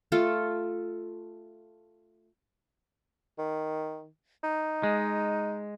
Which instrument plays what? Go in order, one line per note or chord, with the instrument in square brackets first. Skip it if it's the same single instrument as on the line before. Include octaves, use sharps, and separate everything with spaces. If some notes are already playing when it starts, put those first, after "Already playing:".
[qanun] A3 F4 A4
[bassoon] D#3
D#4
[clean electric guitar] G#3